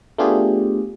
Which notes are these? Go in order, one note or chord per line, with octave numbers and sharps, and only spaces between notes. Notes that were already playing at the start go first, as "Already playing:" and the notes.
A3 B3 D4 F4 G4 G#4